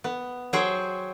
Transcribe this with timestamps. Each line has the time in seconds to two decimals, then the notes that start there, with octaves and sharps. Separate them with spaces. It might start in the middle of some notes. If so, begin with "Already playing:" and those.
0.04 B3
0.53 F#3 G#4 C5 G5